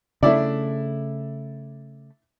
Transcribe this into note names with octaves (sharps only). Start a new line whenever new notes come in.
C#3 A3 D4 E4 D5